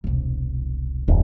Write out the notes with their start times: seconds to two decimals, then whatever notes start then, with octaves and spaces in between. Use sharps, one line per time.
0.04 E1 C2
1.08 D#1 F#2 A#3